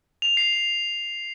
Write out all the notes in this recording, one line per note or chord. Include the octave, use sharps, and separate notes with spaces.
F7
C7
F7